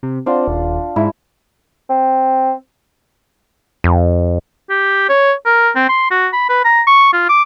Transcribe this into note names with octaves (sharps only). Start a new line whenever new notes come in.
C3
C4 D4 F4 F#5
D#1
G#2 E4
C4
F2
G4
C#5
A#4
C4
C6
F#4
B5
B4
A#5
C#6
F4
D6